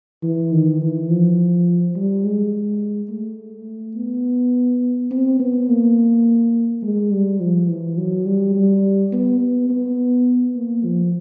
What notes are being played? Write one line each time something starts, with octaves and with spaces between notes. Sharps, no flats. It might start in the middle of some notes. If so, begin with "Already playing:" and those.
E3
D#3
E3
F3
G3
G#3
A3
B3
C4
B3
A#3
G#3
G3
F3
E3
F#3
G3
G3
B3
B3
B3
A#3
F3